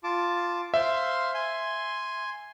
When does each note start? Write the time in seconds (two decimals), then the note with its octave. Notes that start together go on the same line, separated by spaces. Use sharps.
0.04 F4 A5 D6
0.74 C5 E5 F5 C6
1.34 G#5 C6